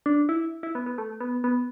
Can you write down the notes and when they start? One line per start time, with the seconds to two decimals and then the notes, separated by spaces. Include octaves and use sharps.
0.06 D4
0.29 E4
0.63 E4
0.75 B3
0.86 B3
0.98 A3
1.21 B3
1.44 B3